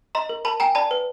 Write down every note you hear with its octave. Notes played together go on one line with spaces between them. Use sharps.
D#5 A#5 C6
A#4
A#4 A5 B5
G5 G#5 A#5
D5 A5 B5
B4